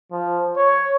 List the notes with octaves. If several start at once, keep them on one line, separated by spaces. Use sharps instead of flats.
F3
C#5